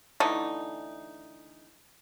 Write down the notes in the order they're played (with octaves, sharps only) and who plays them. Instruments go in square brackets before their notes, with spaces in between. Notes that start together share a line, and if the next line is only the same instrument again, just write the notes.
[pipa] D3 E3 A3 D#4